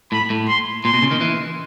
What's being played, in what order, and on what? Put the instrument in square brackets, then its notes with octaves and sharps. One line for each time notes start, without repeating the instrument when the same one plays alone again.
[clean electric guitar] A2 [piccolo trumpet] B5
[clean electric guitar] A2
[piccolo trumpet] C6
[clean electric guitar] A#2 [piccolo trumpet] C6
[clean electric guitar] B2
C#3
D#3
E3